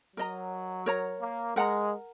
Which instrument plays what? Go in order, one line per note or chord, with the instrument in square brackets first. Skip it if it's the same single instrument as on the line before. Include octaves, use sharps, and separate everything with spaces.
[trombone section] F#3 [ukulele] A#4 D#5 A#5
[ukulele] A#4 C#5 A#5
[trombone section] A#3
[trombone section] G#3 [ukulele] A#4 F#5 A#5